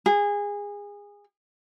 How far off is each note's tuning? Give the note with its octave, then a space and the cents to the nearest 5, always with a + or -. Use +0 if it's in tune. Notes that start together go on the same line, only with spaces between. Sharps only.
G#4 -25